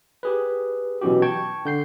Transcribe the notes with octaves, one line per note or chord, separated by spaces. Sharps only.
G4 G#4 B4
B2 E3 F#3 C#4 F#4 G4
G5 A5 C#6 G#6
D3 G6 C7